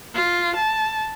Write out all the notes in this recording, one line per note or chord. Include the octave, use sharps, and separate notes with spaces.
F4
A5